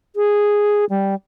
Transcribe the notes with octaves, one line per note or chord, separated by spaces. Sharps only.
G#4
G3